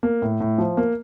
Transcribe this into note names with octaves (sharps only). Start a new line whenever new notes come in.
A#3
A2
A2
F3
A#3